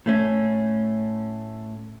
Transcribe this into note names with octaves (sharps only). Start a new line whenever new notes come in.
A2 A3 C#4